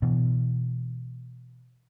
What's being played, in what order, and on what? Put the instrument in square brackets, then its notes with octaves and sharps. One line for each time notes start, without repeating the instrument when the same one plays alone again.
[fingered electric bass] B2 E3